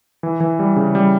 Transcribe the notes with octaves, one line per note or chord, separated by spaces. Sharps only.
E3
E3
G3
C#3
G3